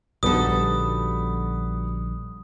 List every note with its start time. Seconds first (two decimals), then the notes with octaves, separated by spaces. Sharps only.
0.23 A#1 D3 G3 B3 D#4 F#4 A4 D#6